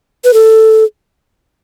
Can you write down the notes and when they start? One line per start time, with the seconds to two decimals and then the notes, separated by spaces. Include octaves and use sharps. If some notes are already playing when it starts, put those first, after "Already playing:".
0.24 B4
0.34 A4